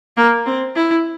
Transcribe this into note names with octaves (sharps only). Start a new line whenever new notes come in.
A#3
C4
E4